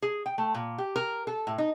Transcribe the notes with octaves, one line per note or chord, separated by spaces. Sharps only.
G#4
G5
A3
A#2
G4
A#4
A4
A2
D#4